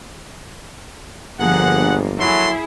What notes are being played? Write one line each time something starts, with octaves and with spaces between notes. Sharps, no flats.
G1 D3 F3 A#3 G#4 F#5
F#3 E4 G#4 A4 C6